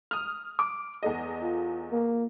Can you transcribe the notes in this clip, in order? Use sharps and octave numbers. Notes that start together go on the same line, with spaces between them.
D#6 F6
D6
E2 A4 D#5
F4
A#3